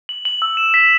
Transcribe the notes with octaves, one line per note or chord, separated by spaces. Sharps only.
F#7
F#7
E6
E7
B6